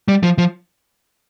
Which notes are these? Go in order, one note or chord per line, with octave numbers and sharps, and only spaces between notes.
G3
F3
F3